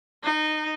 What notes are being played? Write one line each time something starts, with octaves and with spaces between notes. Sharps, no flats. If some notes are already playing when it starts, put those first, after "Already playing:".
D#4